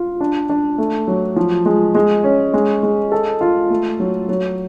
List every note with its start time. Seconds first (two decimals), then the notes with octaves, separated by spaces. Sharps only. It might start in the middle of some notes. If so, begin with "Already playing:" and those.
Already playing: F4
0.20 D4
0.49 D4
0.78 A3
1.08 F#3
1.36 F3
1.66 G#3
1.95 G#3
2.24 C#4
2.54 G#3
2.83 G#3
3.12 A4
3.41 F4
3.70 A3
4.00 F#3
4.29 F#3